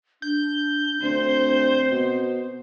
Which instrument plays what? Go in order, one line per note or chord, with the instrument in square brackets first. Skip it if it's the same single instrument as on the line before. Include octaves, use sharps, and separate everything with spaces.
[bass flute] D4 [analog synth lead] G6
[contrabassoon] D2 [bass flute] C4 [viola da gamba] C5
[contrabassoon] B2